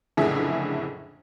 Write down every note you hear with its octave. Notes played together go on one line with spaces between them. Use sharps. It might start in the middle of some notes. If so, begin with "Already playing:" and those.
F#1 F2 A2 D3 G#4 E5